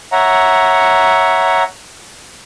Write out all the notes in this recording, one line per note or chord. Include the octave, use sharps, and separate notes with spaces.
C#5 E5 F#5 A#5